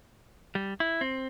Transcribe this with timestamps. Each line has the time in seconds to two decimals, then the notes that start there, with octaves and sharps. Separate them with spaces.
0.55 G3
0.80 E4
1.01 C4